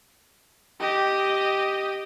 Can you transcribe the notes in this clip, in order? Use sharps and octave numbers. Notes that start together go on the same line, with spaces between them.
G4 D#5